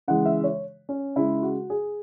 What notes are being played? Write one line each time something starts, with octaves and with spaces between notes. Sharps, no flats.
C#3 E3 G#3 F#5
E5
C#5
C#4
C#3 G#3 E4
F#4
G#4